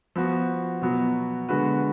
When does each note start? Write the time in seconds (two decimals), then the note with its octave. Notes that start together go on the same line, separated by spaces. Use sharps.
0.16 F3 B3 F#4
0.82 B2 F#3 B3 F#4
1.49 D3 G#3 B3 F#4 B4